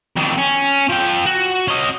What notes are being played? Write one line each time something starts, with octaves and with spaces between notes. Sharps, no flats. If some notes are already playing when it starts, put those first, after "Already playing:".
F2 D#3
C#4
F3 G5
F#4
C#4 D#5